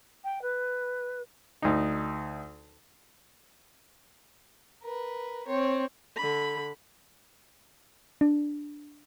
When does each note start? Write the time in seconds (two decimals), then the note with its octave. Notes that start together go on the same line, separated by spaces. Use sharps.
0.24 G5
0.42 B4
1.62 D2 D#4
4.82 A#4 B4
5.47 C4 C#5
6.17 D3 B5
8.21 D4